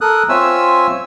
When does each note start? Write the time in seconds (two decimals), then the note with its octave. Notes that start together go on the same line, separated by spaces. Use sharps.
0.01 A4 A#4 D#6 F#6
0.29 C4 F4 C#5 E5 G#5 E6